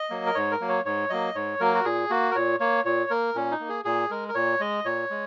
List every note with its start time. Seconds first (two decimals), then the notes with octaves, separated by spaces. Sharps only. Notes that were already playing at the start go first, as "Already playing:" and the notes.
Already playing: D#5
0.10 F#3 A#3
0.26 A#4
0.35 G#2 C#5
0.52 A#4
0.60 F#3 A#3
0.69 C#5
0.85 G#2 C#5
1.10 F#3 A#3 D#5
1.35 G#2 C#5
1.60 F#3 A#3 A#4
1.74 F#4
1.85 A#2 G#4
2.10 A#3 F#4
2.31 A#4
2.36 A#2 C#5
2.60 A#3 C#5
2.85 A#2 C#5
3.10 A#3 A#4
3.35 A#2 C#4
3.51 D#4
3.60 A#3
3.69 G#4
3.85 A#2 G#4
4.10 G#3 A#4
4.28 A#4
4.35 A#2 C#5
4.60 G#3 D#5
4.85 A#2 C#5
5.10 G#3